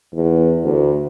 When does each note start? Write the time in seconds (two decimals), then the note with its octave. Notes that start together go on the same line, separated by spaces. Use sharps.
0.14 E2
0.64 D2